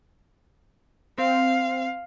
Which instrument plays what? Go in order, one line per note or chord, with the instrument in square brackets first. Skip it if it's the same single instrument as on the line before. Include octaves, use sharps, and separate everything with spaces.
[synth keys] C4 [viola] F5